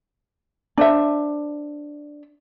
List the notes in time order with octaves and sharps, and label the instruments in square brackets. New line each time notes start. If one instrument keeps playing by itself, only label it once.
[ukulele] D4 C5 E5